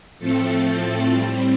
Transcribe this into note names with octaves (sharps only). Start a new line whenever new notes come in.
A2 F3 A3 C4 A4
A2 G3 C4